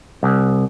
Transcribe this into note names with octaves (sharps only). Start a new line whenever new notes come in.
C2